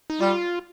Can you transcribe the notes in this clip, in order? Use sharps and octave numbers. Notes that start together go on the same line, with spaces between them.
D#4
G3 F4